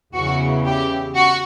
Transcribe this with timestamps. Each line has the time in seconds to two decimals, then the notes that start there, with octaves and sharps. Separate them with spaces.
0.14 E2 C#3 E3 F#4
0.65 G4
1.15 F#4